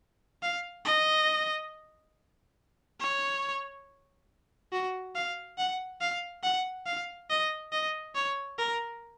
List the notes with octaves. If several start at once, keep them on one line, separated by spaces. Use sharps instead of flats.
F5
D#5
C#5
F#4
F5
F#5
F5
F#5
F5
D#5
D#5
C#5
A#4